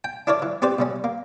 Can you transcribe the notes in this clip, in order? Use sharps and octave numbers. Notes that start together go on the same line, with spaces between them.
G5
D4 E4 A#4 C#5 D5
E3
C4 G4 B4 C5 D5
B2 G3 C#4
A#3